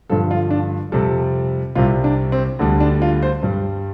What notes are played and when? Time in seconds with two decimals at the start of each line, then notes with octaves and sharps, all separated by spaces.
0.10 G2 D3 F3 A4
0.31 F4
0.50 D4
0.92 F2 C3 G3 A4
1.75 C2 C3 G3 F4
2.04 D4
2.32 C4
2.59 D2 D3 G3
2.80 D4
3.02 F4
3.23 C5
3.43 G2 G3